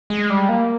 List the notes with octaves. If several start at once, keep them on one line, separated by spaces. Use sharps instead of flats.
G#3
G3
A#3